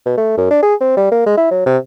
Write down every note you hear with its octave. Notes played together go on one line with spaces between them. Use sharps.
B2
A3
F#2
D4
G#4
C4
G3
A#3
G#3
E4
F#3
C3